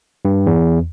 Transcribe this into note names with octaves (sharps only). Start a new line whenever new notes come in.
G2
E2